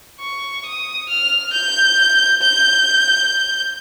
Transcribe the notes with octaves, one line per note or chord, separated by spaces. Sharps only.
C#6
D#6
F6
G6
G6